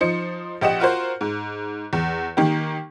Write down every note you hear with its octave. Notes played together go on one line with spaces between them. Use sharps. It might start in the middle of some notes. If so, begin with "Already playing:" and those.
F3 D#4 C5 C#7
A#1 G4 D#5 F#5 E7
F4 F#4 A#4 C5
G#2
E2
D#3 A#3 G4